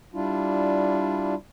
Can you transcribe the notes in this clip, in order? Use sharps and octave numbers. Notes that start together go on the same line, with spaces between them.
G3 D4 E4 F4